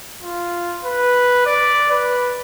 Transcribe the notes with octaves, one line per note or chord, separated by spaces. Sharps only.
F4
B4
D5
B4